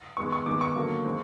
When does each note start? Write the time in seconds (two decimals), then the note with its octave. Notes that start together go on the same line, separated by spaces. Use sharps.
0.17 D#3 G#3 B3 C#6
0.32 C#6
0.46 D#3 G#3 B3 D6
0.61 C#6
0.76 D3 F#3 A#3
1.04 D#3 G#3 C4